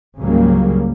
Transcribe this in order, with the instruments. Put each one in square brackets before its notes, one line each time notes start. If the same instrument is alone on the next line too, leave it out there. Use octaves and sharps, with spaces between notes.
[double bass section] C#2 G#2 C#3 F#3 G3 A#3